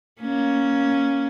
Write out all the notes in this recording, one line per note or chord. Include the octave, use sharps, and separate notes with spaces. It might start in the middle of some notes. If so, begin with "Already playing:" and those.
A#3 C#4